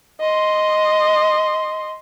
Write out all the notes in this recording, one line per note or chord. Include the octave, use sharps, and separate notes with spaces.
D#5 C6